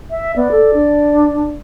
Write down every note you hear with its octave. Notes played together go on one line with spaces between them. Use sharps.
E5
B3 D5
A4
D4